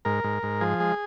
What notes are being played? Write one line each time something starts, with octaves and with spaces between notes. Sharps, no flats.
G#2 A#4
G#2
G#2
F3 G#4
G#3